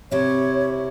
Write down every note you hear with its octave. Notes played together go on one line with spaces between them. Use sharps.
C3 E4 C#5